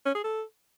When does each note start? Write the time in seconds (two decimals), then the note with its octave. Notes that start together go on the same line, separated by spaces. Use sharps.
0.06 C#4
0.15 G#4
0.24 A4